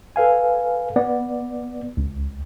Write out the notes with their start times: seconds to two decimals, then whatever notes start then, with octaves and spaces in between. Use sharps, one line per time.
0.16 A4 B4 F5 G#5
0.96 B3 D5
1.97 C#2